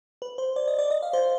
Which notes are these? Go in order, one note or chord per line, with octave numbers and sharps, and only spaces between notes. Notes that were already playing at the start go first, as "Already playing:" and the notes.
B4
C5
D5
D#5
D5
D#5
F5
C5